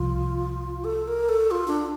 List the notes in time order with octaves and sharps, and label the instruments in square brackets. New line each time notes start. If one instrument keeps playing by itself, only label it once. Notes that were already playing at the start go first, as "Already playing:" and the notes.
Already playing: [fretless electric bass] C2 C3 F3 [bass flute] F4
[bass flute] A4
A#4
A4
F4
D4